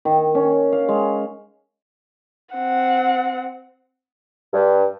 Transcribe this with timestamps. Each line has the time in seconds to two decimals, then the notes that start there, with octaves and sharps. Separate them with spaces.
0.05 D#3
0.35 C#4
0.72 F5
0.89 G#3
2.54 C4 F#5
4.53 G2